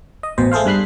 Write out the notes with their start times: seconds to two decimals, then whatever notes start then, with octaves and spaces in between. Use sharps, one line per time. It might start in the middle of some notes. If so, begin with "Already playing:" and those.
0.23 D#5
0.38 A1 B2 C5
0.52 A3 G#4 A4 C5 F5
0.66 G2 G3 B5 F#6 C7